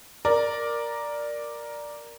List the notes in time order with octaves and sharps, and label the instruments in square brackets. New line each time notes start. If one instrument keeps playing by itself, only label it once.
[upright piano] A#4 D5